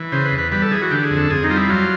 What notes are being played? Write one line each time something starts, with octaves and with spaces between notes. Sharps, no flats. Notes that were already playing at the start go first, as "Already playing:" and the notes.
Already playing: E3
C#3 C5
B4
E2
B4
G3 B4
A4
E3 G#4
F#4
D3 G4
G#4
F2
A4
F2 G#4
D#4
G3 F4
E4
F#3 F4